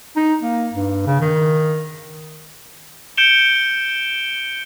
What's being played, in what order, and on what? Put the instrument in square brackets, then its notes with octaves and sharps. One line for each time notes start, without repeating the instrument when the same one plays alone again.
[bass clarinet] D#4
A#3
G2
C#3
D#3
[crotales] G6 C#7 D7 E7 G7